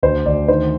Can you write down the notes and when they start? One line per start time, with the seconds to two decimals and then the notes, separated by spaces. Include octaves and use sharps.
0.03 D2 C5
0.25 D2 D5
0.48 D#3 C5